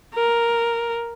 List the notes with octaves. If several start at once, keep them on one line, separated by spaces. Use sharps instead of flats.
A#4